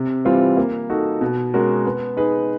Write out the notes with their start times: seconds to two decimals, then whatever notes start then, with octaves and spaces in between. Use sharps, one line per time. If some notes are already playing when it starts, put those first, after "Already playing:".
Already playing: C3
0.25 E3 G3 C4 F4
0.57 A#3
0.90 D#4 F#4 A4
1.21 B2
1.54 G#3 C#4 F#4 A#4
1.85 B3
2.17 D#4 G#4 B4